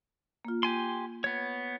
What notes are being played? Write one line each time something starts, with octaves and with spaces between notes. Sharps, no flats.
A#3 F4
G4 G#5 C6
B3 C#5